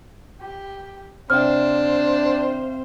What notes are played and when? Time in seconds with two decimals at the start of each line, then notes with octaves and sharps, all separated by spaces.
0.41 G4
1.30 C3 D4 C5 F5 G5 F6